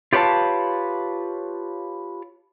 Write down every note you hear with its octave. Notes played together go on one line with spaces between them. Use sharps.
F4 G4 B4 C#5 F5 A5